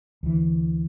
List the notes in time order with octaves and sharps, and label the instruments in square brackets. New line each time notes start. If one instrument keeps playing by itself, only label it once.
[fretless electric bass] D2 E3